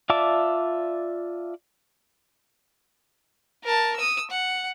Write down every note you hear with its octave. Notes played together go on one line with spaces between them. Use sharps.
F4 D5 E5 A5 D6
A#4 A5
D#6 E6
F#5